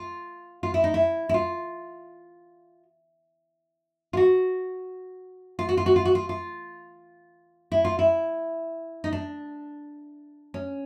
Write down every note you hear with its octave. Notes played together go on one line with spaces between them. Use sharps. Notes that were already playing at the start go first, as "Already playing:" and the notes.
Already playing: F4
F4
E4
D#4
E4
E4
F4
F4
F#4
F4
F#4
F4
F#4
F4
F#4
F4
F4
E4
F4
E4
D#4
D4
C#4